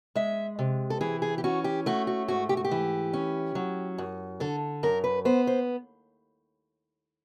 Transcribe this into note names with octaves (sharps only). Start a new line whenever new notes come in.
G#3 E5
C3
A4
E3 G#4
G#4
G4
C#4 F#4
G4
A3 F#4
F#4
G#2 F#4
G4
F#4
G4
E3
C#4
F#3
F#2
D3 A4
F#2 A#4
B4
B3 C5
C5